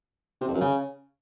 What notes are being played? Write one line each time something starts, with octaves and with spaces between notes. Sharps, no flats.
C3
F2
F#2
C#3